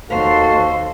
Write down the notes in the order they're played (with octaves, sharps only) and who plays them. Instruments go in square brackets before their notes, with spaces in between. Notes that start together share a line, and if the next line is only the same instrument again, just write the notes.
[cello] D#2 C5 [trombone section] F#4 A4 [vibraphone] F5